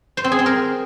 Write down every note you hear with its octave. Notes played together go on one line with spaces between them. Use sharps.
C5
C4
G#4
C4
A#4